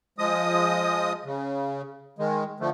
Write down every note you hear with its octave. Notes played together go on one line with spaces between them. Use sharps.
F3 G#3 D#5 D#6
C#3
D#3 G#3
D3 F3 A3